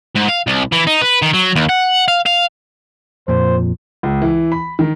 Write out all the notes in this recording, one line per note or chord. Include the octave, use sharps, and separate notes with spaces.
G#2
F5
C2
E3
D#4
B4
D#3
F#3
D#2
F#5
F5
F5
F2 A#2 C5
C#2
E3
B5
D#3